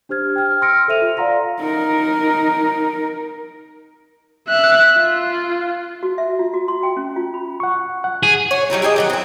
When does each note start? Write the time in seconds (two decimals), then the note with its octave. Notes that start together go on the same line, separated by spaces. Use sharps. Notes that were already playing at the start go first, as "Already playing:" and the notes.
0.09 D4 G4 C5 F6 G#6
0.36 G5 F6
0.62 C6 E6 F6 A#6 C#7 D7
0.88 A4 C5 E5 D#7 F7
1.02 F4
1.17 D5 F5 F#5 A#5 C6 A#6
1.60 D#4 A#4
4.48 E5 F#6
4.97 F4
6.03 F#4
6.18 E5
6.39 F4
6.54 F#4
6.68 C6
6.83 G5
6.97 C#4
7.16 F4
7.34 B5
7.60 F#5 C#6
8.04 F#5
8.23 G#4
8.51 C#5
8.70 F#3 G3 D#4 E4
8.82 E4 G4 G#4 D#5
8.96 D#3 F#3 F#4
9.10 C4 E4